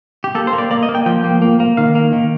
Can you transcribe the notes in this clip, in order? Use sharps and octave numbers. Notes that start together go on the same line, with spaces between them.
G4
A#3 A4
C5
A#3
D5
A#3 D5
D#5
A#3
G5
F3 G5
A#3
A#3
A#3
D#3 F5
A#3
D#3